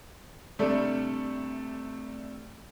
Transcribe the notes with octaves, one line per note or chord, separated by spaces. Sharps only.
C3 G3 A3 D4